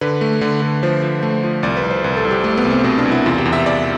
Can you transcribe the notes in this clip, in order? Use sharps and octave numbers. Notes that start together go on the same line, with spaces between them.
D3 B4
A3
D3
D3
F3 C5
F3
A3
F3
C2 D5
B4
C2
C5
C2 B4
A4
C2
G4
A3 A4
B3
C2
C4
B2 C4
D4
C2
E4
E2 F4
G4
E2
E5
E2 D5